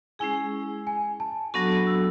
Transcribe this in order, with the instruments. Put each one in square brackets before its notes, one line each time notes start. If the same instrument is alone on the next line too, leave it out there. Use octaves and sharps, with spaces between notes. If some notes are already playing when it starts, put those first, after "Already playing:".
[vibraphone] G#3 C#4 E4 G#4 [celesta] G#5
[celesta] G#5
A5
[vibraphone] F#3 B3 D4 F#4 A4 [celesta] C#6
[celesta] E6